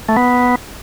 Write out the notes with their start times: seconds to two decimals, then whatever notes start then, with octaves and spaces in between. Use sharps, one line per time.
0.09 A3
0.17 B3